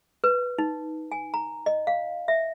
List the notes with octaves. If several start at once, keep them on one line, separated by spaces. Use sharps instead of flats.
B4
D#4
G#5
A#5
D#5
F5
E5